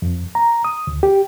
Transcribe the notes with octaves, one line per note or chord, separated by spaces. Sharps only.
F2
A#5
D#6
D2
G4